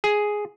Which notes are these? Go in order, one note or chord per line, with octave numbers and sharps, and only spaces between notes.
G#4